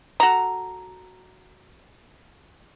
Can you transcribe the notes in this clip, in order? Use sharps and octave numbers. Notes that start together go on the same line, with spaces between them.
F#4 A4 A#5